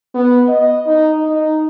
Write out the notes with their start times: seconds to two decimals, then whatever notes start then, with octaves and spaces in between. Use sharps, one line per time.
0.14 B3
0.48 D#5
0.87 D#4
1.23 D#4